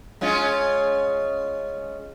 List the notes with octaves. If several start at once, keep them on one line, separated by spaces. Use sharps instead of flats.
G#3 C#4 F4